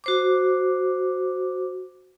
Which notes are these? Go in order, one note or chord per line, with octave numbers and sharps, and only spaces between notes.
F#4 C5 D6